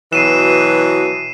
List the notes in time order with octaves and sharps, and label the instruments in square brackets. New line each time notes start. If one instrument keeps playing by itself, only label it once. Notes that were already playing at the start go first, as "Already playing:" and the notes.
[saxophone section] B2 E3 F#3 [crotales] C7 D#7 E7